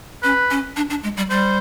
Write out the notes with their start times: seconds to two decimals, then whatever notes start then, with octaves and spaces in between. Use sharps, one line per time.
0.23 C#4 B4
0.51 C#4
0.77 D4
0.90 D4
1.03 G#3
1.17 G3
1.30 G3 C5